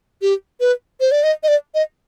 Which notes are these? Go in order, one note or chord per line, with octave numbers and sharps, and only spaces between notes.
G4
B4
C5
D5
D#5
D#5
D5
D#5